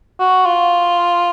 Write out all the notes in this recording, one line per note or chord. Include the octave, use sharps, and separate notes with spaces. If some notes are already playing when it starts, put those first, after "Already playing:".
F#4
F4